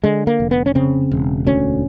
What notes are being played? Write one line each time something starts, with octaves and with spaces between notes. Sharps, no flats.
D3 G#3
A#3
F1
B3
C#4
C#3 C4
E1
D2 C#4